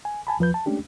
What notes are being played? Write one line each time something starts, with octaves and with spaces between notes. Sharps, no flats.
G#5
G#5 A5 B5
E2 F3 B4 G6
A5
G#3 A3 C#4 D4 G4